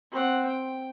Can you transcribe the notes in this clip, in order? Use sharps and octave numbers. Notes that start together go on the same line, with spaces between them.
C4 F#5
G5